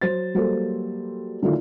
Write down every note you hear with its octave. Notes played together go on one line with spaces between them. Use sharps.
F#3 C5 A6
F#3 G3 A#3 A4 C5
D3 D#3 F#3 A3 E4 F4